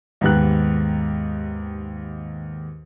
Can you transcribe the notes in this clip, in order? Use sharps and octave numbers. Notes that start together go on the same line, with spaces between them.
D#2 G#2 B3 G4 F#6